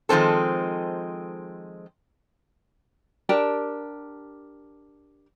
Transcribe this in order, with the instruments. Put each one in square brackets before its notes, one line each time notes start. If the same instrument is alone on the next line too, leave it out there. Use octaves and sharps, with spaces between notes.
[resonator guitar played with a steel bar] D#3 F3 G#3 C4 A4
[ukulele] D4 G4 A#4 A5